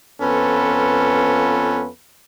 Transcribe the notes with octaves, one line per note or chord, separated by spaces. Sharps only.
F2 B3 C#4 F4 A4 B4